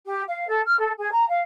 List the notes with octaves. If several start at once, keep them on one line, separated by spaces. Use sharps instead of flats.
G4
F5
A4
F6
A4
G#4
A#5
F5